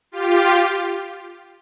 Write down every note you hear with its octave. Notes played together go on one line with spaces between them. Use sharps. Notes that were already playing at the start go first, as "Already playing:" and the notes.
F4 G4